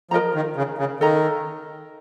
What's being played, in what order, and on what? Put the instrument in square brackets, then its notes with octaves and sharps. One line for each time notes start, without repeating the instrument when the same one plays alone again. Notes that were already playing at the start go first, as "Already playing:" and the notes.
[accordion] F3 [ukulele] A#4 D#5 A#5
[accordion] D#3
C#3
C#3
[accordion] D#3 [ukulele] A4 D#5 A#5